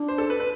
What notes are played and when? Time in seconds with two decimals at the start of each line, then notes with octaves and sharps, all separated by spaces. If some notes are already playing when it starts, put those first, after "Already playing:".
Already playing: D4
0.08 C5
0.18 A4
0.30 B4
0.40 B4